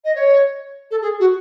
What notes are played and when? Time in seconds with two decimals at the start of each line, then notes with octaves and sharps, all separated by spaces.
0.05 D#5
0.15 C#5
0.91 A4
1.02 G#4
1.20 F#4